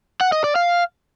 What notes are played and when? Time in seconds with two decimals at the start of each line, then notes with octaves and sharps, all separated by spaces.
0.21 F#5
0.32 D#5
0.44 D5
0.56 F5